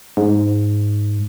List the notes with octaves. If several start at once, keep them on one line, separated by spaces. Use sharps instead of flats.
G#2